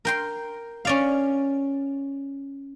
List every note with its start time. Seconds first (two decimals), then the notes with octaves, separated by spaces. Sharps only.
0.05 A#4 G5 C6
0.85 C#4 D5 F5